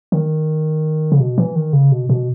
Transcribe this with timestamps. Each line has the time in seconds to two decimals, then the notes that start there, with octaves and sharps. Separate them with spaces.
0.12 D#3
1.12 C#3
1.20 B2
1.38 E3
1.56 D#3
1.73 C#3
1.92 B2
2.09 B2